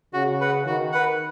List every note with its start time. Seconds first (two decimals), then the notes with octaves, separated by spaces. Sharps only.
0.13 C#3 F#4
0.40 B4 F#5
0.66 D#3 F#4
0.92 B4 F#5